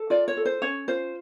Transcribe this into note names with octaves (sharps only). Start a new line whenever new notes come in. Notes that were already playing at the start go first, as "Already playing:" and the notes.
Already playing: A4
F4 D5
C#5
A4
C5
C#4 C#5
F4 C5